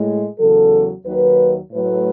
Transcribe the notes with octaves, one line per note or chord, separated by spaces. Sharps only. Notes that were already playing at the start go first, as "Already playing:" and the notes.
Already playing: A2 G#3
E2 C#3 F#3 A4
D#2 D#3 F#3 B4
A2 F#3 A3 B4